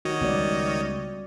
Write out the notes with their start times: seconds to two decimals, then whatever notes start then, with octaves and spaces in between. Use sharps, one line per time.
0.05 D#3 A3 F#4 C#5 D#5
0.21 C#2 G3 B3 D5